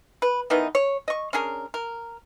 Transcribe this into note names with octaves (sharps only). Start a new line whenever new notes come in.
B4
D#3 E3 B3 D#4
C#5
D#5 C#6
C#4 D4 G#4 A#4
A#4